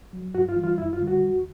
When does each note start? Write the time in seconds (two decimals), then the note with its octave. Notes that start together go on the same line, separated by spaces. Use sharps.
0.13 F#3
0.34 G2 F#4
0.49 F4
0.56 E3 G3
0.63 F4
0.78 F#2 E4
0.93 F4
0.99 D3 G3
1.08 F#4
1.21 E2